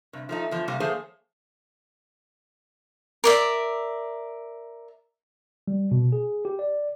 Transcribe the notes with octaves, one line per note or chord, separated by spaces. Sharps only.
G2 C3
F3 A3 D#4
E2 F3
C3 G3 A#3 C4
F3 A3 A#3 G#4 C5 C#5
A#4 D5 E5
G3
B2
G#4
G4
D5